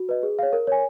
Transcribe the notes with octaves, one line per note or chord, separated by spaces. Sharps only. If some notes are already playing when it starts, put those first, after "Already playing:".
Already playing: F#4
B4 D#5
G#4
C#5 F5
A#4
C#5 G#5